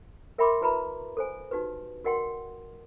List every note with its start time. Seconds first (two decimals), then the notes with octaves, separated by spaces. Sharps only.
0.38 A#4 E5 G5 B5 C6 D6
0.61 E4 F#4 B4 E5 A#5 B5
1.17 A4 C5 G#5
1.51 D#4 F#4 G4 B4
2.04 F#4 A#4 D#5 F#5 G5 C6